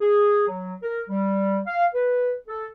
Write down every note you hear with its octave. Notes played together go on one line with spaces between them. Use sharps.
G#4
F#3
A#4
G3
F5
B4
A4